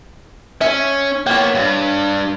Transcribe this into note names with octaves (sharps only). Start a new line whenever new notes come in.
C#4 E5
A#3 B3 C#5 G5
G2